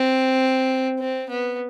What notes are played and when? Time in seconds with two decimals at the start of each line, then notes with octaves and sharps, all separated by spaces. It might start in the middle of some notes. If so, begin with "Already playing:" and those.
Already playing: C4
0.99 C4
1.30 B3